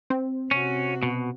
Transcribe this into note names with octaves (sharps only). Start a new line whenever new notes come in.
C4
C3 C#4 F#4
B2